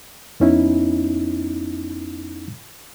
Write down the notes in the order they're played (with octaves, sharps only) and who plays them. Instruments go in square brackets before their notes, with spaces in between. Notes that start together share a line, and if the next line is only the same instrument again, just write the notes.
[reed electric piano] F2 B3 C#4 D#4 E4